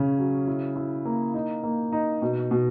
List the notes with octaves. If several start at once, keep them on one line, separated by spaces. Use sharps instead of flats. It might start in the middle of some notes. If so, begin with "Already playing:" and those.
Already playing: C#3 C#4
F#3
E4
E4
A#3
D#4
A#3
D#4
B2
B2